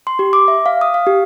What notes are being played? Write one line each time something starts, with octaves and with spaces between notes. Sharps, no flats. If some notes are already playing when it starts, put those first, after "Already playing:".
C6
G4
D6
E5
F5
D#6
F5
G4